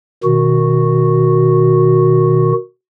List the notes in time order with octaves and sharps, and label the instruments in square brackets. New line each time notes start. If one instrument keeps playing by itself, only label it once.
[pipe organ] B2 D#3 F#4